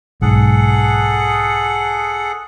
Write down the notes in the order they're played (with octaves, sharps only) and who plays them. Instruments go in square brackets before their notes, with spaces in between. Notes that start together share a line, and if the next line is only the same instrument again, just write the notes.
[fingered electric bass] B1 G#2 [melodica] G#4 A4 F#5